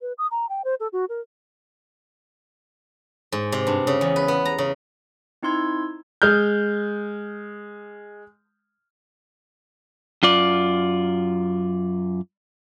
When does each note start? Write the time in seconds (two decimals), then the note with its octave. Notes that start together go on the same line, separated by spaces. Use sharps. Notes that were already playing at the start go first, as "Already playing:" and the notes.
0.01 B4
0.18 D#6
0.31 A#5
0.49 G5
0.65 C5
0.80 A4
0.93 F#4
1.09 A#4
3.32 G#2
3.52 C3
3.67 G2
3.87 C#3
4.01 E2
4.16 B4
4.28 B3
4.45 A#5
4.58 C#3
5.43 C4 D#4 E4 C6 E6 G#6
6.22 G#3 F6 G6
10.23 F#2 F4 D5